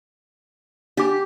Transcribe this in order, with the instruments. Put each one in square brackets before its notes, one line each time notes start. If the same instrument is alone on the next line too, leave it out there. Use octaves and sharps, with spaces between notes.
[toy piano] D4 D6 [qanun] G4